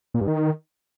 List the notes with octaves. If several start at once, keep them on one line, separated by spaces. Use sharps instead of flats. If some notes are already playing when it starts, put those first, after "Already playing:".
A#2
G2
D#3